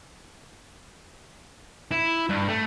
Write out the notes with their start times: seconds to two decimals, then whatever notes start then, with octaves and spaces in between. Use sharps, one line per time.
1.91 E4
2.29 G2
2.48 A3